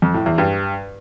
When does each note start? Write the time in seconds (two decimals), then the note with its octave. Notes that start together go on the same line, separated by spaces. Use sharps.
0.02 F2
0.14 A2
0.26 E2
0.38 G2